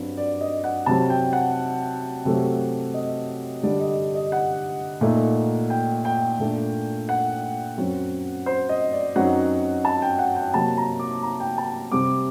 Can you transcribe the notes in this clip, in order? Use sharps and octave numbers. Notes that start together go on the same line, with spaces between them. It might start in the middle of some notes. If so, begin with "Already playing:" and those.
Already playing: G2 F#3 C4
D5
D#5
F#5
C3 F#3 C4 A5
G5
F#5
C3 F#3 A3 C4
D#5
D3 G3 D4 D5
D#5
D#5
F#5
A#2 A3 D#4
G5
G5
A#2 A3 D4
F#5
F#2 F#3 C4
C5
D#5
D5
F#2 F#3 C4 D#4 F#5
A5
G5
F#5
G5
C3 F#3 A#3 A5
A#5
D6
A#5
G5
A5
C3 G3 C4 D6